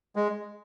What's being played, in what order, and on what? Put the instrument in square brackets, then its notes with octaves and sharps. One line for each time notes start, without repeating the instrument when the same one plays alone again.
[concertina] G#3